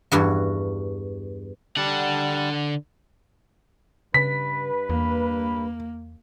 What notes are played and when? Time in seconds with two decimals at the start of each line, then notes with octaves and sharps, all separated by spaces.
0.12 E2 G2 F#4
1.77 D3 G3 F#5 A5
4.14 G2 C#3 B4 B6
4.90 E2 A#3